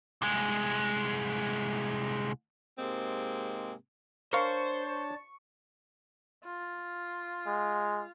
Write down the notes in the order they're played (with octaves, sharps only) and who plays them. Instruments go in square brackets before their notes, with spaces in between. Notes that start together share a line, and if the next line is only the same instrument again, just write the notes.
[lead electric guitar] C2 G#3
[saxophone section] G#2 C3 G#3 A#3 C4
[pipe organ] D4 C#5 A5 [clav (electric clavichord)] A#4 F5 [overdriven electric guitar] C5 [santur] C#6
[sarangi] F4
[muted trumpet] G#3